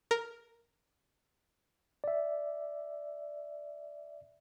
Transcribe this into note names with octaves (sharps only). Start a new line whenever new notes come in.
A#4
D5 E5